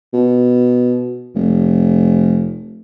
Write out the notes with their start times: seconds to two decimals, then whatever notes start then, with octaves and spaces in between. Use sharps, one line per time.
0.13 B2
1.35 F1